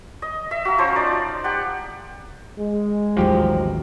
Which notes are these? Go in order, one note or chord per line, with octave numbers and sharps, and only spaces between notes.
D#5
E5
F#4 F5 A#5
F3 C#4 C5 A#5
D#4 D5
G4 F#5
G#3
A1 D#2 F3 F#3 D#4 G4